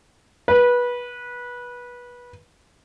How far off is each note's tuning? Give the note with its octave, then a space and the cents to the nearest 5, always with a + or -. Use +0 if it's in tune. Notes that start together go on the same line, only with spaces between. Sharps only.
B4 -20